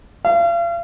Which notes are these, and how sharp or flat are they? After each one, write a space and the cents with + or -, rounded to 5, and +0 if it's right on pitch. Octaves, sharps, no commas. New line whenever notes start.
F5 -40